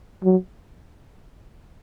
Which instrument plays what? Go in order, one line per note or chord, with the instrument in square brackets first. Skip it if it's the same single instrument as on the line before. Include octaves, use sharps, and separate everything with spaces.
[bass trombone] F#3